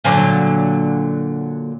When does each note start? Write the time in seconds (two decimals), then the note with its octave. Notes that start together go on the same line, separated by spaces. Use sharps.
0.04 A#2 D3 F#3